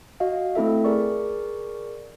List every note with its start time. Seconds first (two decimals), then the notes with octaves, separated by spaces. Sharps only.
0.20 F#4 D#5 F5
0.55 A3 C4 E4 A4 E5
0.84 G#4 A#4 D5 C#6